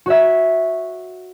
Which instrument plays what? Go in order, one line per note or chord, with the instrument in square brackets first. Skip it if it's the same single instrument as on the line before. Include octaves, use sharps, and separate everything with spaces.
[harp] F#4 C#5 E5